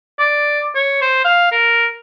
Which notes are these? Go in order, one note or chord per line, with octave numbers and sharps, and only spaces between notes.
D5
C#5
C5
F5
A#4